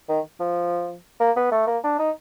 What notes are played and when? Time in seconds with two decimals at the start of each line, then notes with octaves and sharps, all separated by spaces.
0.09 D#3
0.40 F3
1.20 A#3
1.36 B3
1.51 A3
1.67 A#3
1.84 D4
1.99 D#4